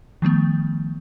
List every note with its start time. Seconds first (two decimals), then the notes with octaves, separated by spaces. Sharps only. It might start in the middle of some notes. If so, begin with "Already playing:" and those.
0.22 D#3 F3 A3 B3